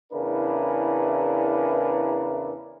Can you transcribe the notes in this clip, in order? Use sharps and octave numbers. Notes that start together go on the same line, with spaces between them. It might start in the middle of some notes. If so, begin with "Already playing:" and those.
E2 C#3 D4 E4 A#4 B4